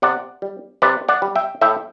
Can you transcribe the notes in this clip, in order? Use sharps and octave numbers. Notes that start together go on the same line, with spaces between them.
C3 D5 F#5
G3
C3 B4 D5
D5 F#5
G3
E5 G5
A2 E5 G5